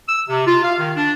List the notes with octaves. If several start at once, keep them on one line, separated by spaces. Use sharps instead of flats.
E6
C3
F4
F5
D#3
D4